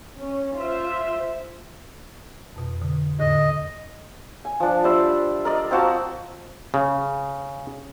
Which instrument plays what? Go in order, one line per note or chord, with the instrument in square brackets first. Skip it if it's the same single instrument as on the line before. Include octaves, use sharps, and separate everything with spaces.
[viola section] C#4
F4 C5 E5
[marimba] F2 B2
B2 D3
[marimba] E2 A2 D3 [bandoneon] D#5
[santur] G#5
F3 D4
G3 C5 D5 E5
A#4 D5 D#5
C4 F4 F#4 A5
[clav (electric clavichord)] C#3